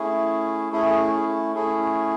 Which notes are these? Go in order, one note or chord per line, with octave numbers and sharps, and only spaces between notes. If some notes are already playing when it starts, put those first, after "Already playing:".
Already playing: A3 C#4 E4 G#4
A3 C#4 E4 G#4 A4
G#4
G#4
A3 C#4 E4 G#4 A4